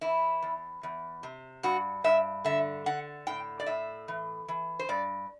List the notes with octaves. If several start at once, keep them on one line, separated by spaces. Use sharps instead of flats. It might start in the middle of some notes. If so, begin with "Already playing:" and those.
E3 E4
E2
E2
C3
G2 F#4
G2 E5
D3 E5
D3 F#5
A2 G5
D5
A2 E5
E3
E3
C5
G2 D5